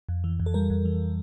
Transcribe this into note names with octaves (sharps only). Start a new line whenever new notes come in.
F2
E3
F2
A4
G3 A#4
F2
E3